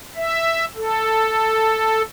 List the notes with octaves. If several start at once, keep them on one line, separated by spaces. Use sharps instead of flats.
E5
A4